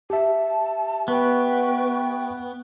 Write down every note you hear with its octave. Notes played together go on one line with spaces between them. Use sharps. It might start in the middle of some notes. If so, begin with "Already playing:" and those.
G4 E5 A5
B3 B4 G5 C#6